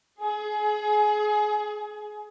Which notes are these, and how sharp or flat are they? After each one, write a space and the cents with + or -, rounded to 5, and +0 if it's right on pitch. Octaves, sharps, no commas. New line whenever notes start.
G#4 +25